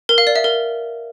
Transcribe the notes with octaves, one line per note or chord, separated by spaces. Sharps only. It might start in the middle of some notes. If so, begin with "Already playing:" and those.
A#4
F5
D5
E5
A#4